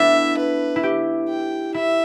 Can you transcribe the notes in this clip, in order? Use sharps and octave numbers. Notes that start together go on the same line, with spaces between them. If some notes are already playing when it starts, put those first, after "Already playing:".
Already playing: A3 B3 D4 E4 E5
B4
E4
G4
G5
E4 E5